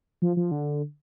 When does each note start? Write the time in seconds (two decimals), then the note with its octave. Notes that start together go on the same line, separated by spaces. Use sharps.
0.22 F3
0.37 F3
0.51 D3